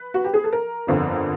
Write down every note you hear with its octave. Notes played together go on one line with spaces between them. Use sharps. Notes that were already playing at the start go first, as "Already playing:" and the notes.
Already playing: B4
F#4
G4
G#4
A4
A#4
G1 F2 D3